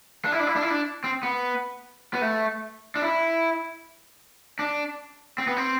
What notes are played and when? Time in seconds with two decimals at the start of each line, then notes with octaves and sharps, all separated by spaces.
0.25 D4
0.32 E4
0.40 D4
0.47 E4
0.56 D4
0.62 E4
0.71 D4
1.04 C4
1.23 B3
2.14 B3
2.22 A3
2.96 D4
3.02 E4
4.59 D4
5.38 C4
5.47 B3
5.56 C4